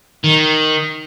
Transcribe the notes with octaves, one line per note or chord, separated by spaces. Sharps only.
D#3